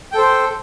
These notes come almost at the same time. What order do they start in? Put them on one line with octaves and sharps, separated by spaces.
G5 A4 C5